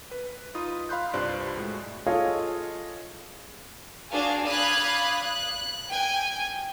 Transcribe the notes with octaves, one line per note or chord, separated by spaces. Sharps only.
B4
D#4 F4 B5 D#6
F5 B5 C6 F#6 G6
C2 G2 F4 C5 D5 F#6
A2 G#3 F#4
F4 G#4 A4 C#5 D#5 F5
D4 F#4 G#4 F5
D5 F5 B5 D#6 F#6 G#6
F#6
G5 G#5